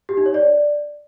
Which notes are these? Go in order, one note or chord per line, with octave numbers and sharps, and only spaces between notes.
G4
D#4
C#5
D5